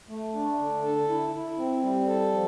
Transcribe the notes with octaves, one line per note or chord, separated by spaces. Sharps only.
A3
D4
D3
A4
E4
E4
C4
G3
A4
F3